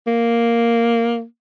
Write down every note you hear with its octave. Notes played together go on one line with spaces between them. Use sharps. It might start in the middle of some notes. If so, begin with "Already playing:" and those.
A#3